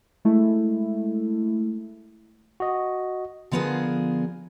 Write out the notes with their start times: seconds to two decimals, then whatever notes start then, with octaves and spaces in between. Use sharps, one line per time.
0.25 G#3 A3 E4
2.60 F#4 D#5
3.51 D3 F3 B3 F4 G#4 A#4